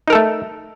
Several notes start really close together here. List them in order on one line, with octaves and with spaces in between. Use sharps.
D#4 A#4 A4 A3